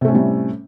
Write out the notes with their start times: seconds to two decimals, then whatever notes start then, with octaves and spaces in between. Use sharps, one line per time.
0.01 C3
0.05 A3
0.08 C#4
0.11 A2
0.15 G3